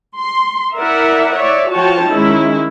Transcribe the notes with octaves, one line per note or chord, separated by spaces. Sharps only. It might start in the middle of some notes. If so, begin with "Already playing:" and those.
C6
E4 A#4 D5 E5 F#5
C#5 D5 E5
F3 F4 F#4 C#5 G5 A5
D#3 G#3 C#4 D#4 E4